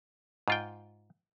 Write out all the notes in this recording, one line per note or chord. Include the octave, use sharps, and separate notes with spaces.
G#2 F4 G5